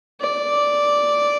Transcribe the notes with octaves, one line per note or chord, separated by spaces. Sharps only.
D5